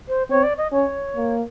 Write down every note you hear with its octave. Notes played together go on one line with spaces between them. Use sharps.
C5
C4 C#5
D5
D#5
C#4 C#5
A#3